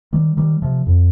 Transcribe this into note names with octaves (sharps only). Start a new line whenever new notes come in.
D#3 G3
D#3 G3
C3 F3
F2